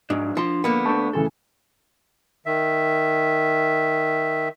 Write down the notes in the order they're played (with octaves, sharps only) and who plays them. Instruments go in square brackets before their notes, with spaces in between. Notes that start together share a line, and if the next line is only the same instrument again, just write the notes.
[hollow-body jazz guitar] G#2 [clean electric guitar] F3 F#3 D4
[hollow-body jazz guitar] F3 [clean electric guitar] D4 C6
[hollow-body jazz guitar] D3 A#3 B3 [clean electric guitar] F3
[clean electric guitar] A3 D4 [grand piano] A5 C#6 G6
[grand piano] A2 C#3 E3 [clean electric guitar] A4
[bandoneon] D#3 E5